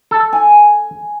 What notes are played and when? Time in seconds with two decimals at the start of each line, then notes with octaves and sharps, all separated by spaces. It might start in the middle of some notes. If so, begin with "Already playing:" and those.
0.11 A4
0.33 G#5